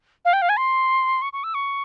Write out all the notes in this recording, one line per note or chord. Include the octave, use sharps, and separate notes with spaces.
F5
G5
F5
G#5
C6
C#6
C#6
E6
C#6